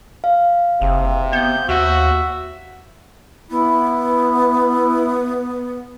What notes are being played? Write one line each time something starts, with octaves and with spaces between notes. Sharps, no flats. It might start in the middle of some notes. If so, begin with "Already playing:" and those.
F5
F#1 C3
B3 G6
D#2 F#4 E5
B3 E4